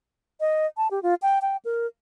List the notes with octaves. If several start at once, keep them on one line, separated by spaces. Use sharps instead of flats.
D#5
A5
G4
F4
G5
G5
A#4